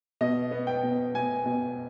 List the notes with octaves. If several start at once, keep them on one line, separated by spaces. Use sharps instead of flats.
B2 D#5
B3
G5
B2
B2 G#5
B2